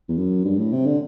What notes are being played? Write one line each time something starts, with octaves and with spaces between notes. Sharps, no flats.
E2
F#2
G2
A2
C3
D3